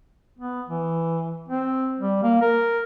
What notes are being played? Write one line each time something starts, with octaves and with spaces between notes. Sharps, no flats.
B3
E3
C4
G3
A#3
A#4